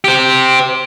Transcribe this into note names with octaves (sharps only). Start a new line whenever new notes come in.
G4 C5